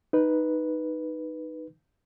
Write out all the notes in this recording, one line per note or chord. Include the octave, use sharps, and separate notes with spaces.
D#4 B4